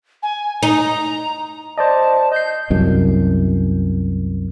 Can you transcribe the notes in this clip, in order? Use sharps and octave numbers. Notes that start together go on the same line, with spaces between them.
G#5
D#4 A#5
C5 D5 D#5 A5
D#5 G6 C7
C2 F#2